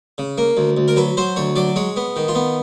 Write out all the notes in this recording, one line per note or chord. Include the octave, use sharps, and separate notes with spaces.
C#3
A#3
D2
D2
A#4
F#3 B4
F#3 C5
D2 C#5
F#3 D5
G#3 C#5
B3
D#3
F4
B3